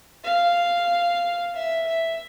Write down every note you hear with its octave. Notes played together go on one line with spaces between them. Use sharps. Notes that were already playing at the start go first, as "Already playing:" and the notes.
F5
E5
E5